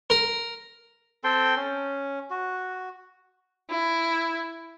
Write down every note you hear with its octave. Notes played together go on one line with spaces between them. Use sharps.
A#4
C4 A4 G5 C6
C#4
F#4
E4